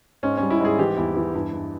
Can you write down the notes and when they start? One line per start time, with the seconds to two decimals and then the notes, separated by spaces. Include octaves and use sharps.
0.23 G#2 C#4
0.37 G3 C#4
0.51 E4
0.60 G#2 G#4
0.79 E3 G4
0.97 E2 E4
1.16 E3 E4
1.34 G2 E4
1.53 G2